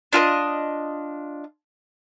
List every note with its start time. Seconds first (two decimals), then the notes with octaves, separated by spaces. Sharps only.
0.13 D4 F4 A4 D#5